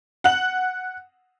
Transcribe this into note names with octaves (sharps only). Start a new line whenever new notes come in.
F#5 F#7